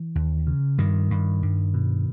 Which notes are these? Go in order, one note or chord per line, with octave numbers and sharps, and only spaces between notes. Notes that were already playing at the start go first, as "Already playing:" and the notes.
Already playing: E3
D#2
C#3
G2 D#3
G2
G2
B2